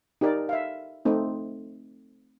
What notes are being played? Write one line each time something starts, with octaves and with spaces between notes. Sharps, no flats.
D#4 G4 A#4 D5
E5 F5
A3 C4 D#4